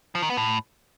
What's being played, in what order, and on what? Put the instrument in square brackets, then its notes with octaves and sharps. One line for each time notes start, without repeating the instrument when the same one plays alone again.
[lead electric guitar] F3
D#3
B3
A2